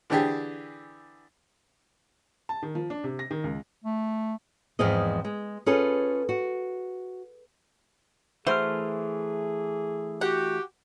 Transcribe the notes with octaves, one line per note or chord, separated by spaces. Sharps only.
D3 E3 D4 G4 G#4
A5
D#3
F3
D4
C3
A#6
D#3
C#2
A3
E2 G#2 F3 C4 G#4 D#5
G#3
C#4 F4 G#4 A4 B4
F#4
E3 A3 E4 F#4 G#4 C5 F6
F#4 G4 F#5